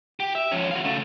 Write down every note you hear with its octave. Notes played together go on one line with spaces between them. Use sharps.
G4
E5
F3 C#4
F#4 F5
C#3 A3